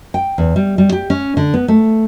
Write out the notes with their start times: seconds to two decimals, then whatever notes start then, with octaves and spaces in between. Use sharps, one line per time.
0.14 G5
0.38 E2
0.56 G3
0.78 G3
0.92 G4
1.10 C#4
1.37 D3
1.54 B3
1.68 A3